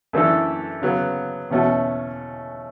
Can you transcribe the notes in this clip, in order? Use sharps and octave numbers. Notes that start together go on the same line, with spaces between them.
F#2 E3 A3 D4 A4
C#3 F#3 B3
E2 B2 A3 C#4 F#4